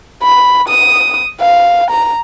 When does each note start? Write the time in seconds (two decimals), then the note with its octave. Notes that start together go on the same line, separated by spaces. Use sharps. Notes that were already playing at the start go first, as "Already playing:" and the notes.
0.23 B5
0.69 D#6
1.41 F5
1.91 A#5